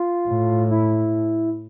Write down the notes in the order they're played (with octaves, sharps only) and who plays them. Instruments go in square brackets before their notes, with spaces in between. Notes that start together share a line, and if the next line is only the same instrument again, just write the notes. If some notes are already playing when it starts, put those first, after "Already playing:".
Already playing: [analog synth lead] F4
[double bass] A2
[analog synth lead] E4